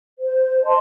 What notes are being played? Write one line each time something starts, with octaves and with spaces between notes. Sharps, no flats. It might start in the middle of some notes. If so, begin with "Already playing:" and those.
C5
D#5 A5 C6